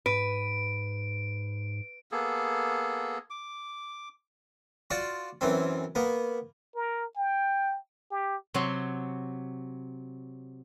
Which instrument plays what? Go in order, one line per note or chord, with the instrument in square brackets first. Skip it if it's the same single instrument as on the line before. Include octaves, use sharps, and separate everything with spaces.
[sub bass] G#2 [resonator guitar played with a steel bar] B4 [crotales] D7
[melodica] A#3 B3 G#4 A4
D6
[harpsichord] F4 F#4 D5
F#2 E3 C4
A#3 B3
[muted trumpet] A#4
G5
G4
[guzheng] C3 F#3 C#5 F#5 C6